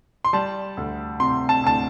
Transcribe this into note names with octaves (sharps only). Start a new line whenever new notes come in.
C6
G3 A5
D2
C3 C6
A5
D2 A5